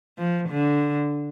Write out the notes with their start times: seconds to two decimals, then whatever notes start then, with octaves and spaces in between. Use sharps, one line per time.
0.18 F3
0.49 D3